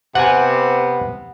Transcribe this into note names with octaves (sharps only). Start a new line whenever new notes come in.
C3 B3 F#5 G#5